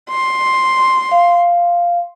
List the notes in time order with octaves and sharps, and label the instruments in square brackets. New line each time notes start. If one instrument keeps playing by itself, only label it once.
[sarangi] C6
[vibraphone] F5